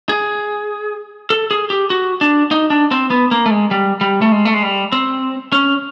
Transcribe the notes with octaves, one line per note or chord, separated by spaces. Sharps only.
G#4
A4
G#4
G4
F#4
D4
D#4
D4
C4
B3
A#3
A3
G#3
G3
G3
A3
G#3
A3
G#3
G3
C4
C#4